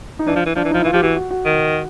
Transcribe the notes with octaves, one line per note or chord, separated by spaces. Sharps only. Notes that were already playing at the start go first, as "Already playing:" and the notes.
D#4
E3 D4
F3
E3
F3 D4
E3
F3 D#4
E4
E3 F4
F3 G4
E3 F#4
F#4
F#4
D#3